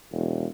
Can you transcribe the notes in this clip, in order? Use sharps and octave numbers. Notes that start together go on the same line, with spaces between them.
E1